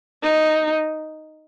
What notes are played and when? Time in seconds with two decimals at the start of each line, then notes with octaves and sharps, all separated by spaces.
0.23 D#4